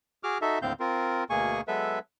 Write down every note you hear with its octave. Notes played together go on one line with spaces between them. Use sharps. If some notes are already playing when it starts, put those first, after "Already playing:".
F#4 G#4 D6 F6
D#4 F#4 A4 E5
D#2 A2 D3 C4 F5 G6
C4 F4 A#4
D2 B2 A#3 G#4 G#5 C#6
F#3 G#3 B3 A4 B4 E5